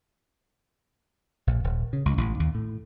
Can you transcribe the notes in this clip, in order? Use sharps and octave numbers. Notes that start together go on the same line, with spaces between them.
A#1
D#1
C#3
C#2
A1
D#2
A2